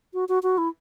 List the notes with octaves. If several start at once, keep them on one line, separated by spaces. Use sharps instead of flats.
F#4
F#4
F#4
E4